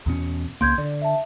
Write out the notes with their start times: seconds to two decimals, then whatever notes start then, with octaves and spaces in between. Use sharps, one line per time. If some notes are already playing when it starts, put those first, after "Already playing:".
0.06 E2 B2 C#4
0.61 C#2 C#3 A#3 C6 G6 G#6
0.78 D3 D5
1.02 E5 A5